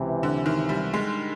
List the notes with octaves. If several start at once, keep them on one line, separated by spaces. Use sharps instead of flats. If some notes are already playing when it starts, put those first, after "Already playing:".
Already playing: C#2 C3 E3
D3
D#3
G3
G#3